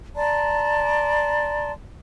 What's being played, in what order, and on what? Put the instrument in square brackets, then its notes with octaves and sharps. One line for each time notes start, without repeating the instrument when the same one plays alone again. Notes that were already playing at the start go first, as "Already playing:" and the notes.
[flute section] D5 A5 A#5 C6